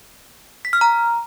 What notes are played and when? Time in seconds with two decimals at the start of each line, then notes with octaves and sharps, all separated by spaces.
0.65 B6
0.73 F6
0.81 A#5